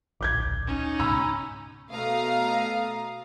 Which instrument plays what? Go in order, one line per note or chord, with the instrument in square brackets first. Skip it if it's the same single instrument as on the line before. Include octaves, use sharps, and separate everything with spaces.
[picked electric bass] D1 A#1 [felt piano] D6 G6 G#6
[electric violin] C#4 D#4
[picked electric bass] C#2 G#2 B2 [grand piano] A#5 B5 E6
[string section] B2 A3 F5 A#5 D#6